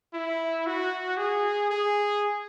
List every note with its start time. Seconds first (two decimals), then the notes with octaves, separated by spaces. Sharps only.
0.14 E4
0.66 F#4
1.17 G#4
1.70 G#4